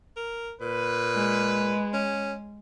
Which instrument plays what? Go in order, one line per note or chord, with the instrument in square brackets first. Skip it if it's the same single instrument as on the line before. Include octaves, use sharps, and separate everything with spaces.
[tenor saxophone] A#4
[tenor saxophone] A#2 [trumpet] B4
[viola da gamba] G#3
[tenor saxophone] C#4